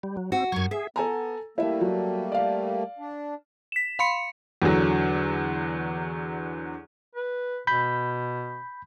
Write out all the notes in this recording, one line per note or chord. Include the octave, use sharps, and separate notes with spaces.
G3
F#3
C4 F#4
F#2 F#3 C#6 G#6
G#4 E5
B3 A4 G#5 A#5
G3 A3 A#3 E4 E5
F#3
D5 F5
D4
B6 E7
F5 B5 C6 C#7
E2 D3 F#3
B4
B2 B5 G6 B6